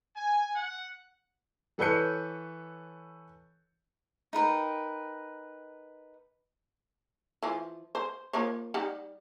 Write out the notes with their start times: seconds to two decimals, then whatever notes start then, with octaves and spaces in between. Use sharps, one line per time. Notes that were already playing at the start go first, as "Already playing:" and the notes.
0.16 G#5
0.55 F#5
1.78 E3 A4 B4 C#5 G6 C#7
4.33 D#4 A#4 B4 G5
7.43 E3 F3
7.95 C5
8.33 F3 A#3 C#5
8.74 G3 D#4 F#5